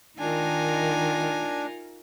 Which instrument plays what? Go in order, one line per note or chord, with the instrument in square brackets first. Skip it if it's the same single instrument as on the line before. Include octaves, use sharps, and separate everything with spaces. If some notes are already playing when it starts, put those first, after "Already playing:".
[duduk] D#3 [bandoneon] D4 [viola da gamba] D#4 F4 A#4 [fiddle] G#5